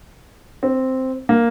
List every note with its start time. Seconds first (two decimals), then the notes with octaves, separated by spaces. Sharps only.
0.63 C4
1.29 A#3